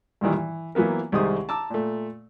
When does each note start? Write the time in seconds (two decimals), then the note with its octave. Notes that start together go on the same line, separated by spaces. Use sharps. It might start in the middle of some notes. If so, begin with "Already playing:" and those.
0.21 G2 A#2 D#3 E3 G3
0.34 E3
0.75 E3 F#3 A#3 B3 A#4
1.12 C2 C3 D#3 G#3 C5 D#6
1.49 A5 A#5 D6 E6
1.70 A#2 A3